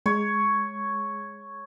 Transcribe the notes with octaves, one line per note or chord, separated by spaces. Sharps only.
G#3 C#5